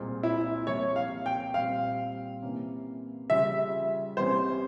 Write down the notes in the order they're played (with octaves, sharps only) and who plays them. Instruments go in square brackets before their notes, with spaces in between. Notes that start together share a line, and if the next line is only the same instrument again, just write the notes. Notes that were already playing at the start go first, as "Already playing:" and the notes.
Already playing: [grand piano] C2 A#2 G#3 C4 F4
[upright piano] E4
[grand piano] C2 C3 F3 A#3 [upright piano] C#5
[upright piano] F5
G5
[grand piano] A#2 G3 C4 [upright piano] F5
[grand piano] C3 E3 A#3 C#4
[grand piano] C#3 G3 C#4 F4 [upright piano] E5
[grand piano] C2 C3 E3 G3 C#4 [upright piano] C5